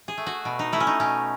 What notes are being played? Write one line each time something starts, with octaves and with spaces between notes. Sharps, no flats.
G#4
A3
F#4
B2
D#4
A3 E4
C#4
D#4
B2 C#4